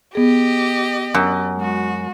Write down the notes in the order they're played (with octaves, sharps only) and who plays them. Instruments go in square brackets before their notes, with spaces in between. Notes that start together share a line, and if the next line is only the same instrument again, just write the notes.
[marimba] B3 G#4 [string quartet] G4 D#5
[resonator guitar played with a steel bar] F#2
[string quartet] G#3 F#4